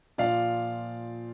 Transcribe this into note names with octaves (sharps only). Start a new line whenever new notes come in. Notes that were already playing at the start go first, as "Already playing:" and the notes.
A#2 F3 D5 F5